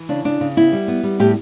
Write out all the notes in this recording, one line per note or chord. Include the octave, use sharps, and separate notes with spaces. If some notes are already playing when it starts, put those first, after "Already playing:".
Already playing: E3
C#3 D4
C#3 D4
C#3
B3 E4
G3
B3
G3
A2 G4